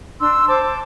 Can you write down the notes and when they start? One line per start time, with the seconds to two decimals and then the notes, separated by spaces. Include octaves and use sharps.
0.20 D4 C6 E6
0.48 C5 A5 D6